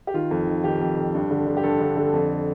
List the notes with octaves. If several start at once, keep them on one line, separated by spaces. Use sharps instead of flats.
G4
D#3 F4
F2
D#3
D#3 G4
F2
F2
G2
D3
D3
G4
G2 A4
D3
D3
F2